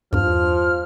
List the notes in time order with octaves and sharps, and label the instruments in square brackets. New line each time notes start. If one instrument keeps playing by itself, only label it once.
[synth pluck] E2 G2 [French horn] F3 [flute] F6